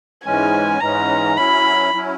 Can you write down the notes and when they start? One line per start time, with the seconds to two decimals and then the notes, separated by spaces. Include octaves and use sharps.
0.25 G#2 E3 G#3 C#4 G#5
0.81 G#2 E3 G#3 C#4 A#5
1.37 F#3 C#4 E4 B5
1.93 F#3 C#4 E4